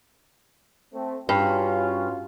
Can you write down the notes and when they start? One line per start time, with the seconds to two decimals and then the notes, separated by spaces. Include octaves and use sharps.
0.94 A3 C4
1.29 G2 C#4 F4 F#4